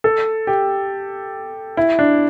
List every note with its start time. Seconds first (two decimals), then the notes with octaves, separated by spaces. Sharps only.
0.04 A4
0.47 G4
1.77 E4
1.99 D4